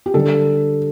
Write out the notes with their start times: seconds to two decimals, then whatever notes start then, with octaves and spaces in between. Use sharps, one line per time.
0.06 G4
0.14 D3 G3 A4